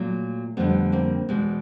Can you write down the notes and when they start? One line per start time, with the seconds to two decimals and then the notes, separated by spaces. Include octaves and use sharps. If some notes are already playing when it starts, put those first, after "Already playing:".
Already playing: A#2 F#3 A3
0.57 F2 D3 G3 A3 B3
0.92 A#3 C4
1.29 E2 B2 G#3